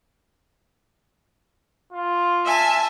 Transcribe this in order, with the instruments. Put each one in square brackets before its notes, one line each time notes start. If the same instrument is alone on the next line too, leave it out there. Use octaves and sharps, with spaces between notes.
[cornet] F4
[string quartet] E5 G#5 A5